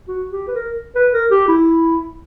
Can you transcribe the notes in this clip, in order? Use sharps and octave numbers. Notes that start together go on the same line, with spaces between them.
F#4
G4
B4
A#4
B4
A#4
G4
E4